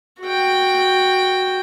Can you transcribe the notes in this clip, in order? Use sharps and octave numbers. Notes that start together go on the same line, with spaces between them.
F#4 G5